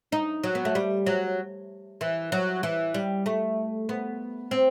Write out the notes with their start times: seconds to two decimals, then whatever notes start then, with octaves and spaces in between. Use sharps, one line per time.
0.12 D#4
0.44 F#3
0.55 B3
0.65 A3
0.75 G3
1.06 F#3
2.01 E3
2.32 F#3
2.63 E3
2.94 G3
3.26 A3
3.89 B3
4.51 C4